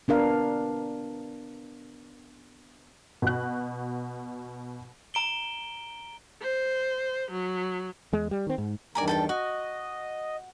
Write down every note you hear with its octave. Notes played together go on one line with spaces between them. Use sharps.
B3 D4 A#4 F5
B2 F#4 F#6
A#5 D7 G7
C5
F#3
E2 G#3
G3
D#3 C4
G#2
E2 G2 D#3 D5 G#5 A#5
A4 G5 A5
F#4 D#5